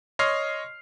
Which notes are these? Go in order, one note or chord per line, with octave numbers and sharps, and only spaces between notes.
C#5 D#5 C6 F6 C7